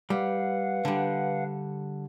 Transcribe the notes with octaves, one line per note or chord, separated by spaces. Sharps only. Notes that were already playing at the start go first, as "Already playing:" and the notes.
G3 B4 F5 F#5
D3 G3